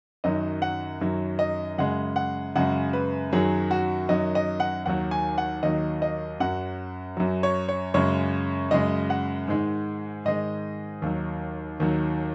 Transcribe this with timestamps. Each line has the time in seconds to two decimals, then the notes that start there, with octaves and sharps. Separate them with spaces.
0.24 F#2 D#3 F#3 D#5
0.62 F#5
1.01 F#2 D#3 F#3
1.39 D#5
1.78 F#2 C#3 G#3 F#5
2.16 F#5
2.56 F#2 C#3 G#3 F#5
2.93 B4
3.32 F#2 D#3 F#3 G#4
3.71 F#4
4.09 F#2 D#3 F#3 D#5
4.35 D#5
4.60 F#5
4.86 D#2 D#3 F#3 F#5
5.11 G#5
5.38 F#5
5.63 D#2 D#3 F#3 D#5
6.02 D#5
6.40 F#2 F#3 F#5
7.17 F#2 F#3
7.43 C#5
7.68 C#5
7.94 F#2 C#3 G#3 C#5
8.71 F#2 C#3 G#3 D#5
9.10 F#5
9.48 G#2 D#3 G#3
10.25 G#2 D#3 G#3 D#5
11.02 D#2 D#3 F#3
11.80 D#2 D#3 F#3